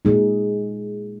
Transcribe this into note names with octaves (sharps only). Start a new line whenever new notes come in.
A#2 G#3 D#4